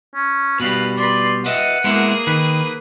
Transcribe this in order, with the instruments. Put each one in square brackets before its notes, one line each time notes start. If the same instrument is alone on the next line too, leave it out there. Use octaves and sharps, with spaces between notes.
[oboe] C#4
[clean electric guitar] B2 G3 [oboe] B4 [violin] F5 B5
[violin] B4 C6 [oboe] D5
[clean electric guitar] B4 D#5 E5 [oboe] F#5 [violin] D#7
[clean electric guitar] G#3 B3 E4 [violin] A#3 G#4
[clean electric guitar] D#3 [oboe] B4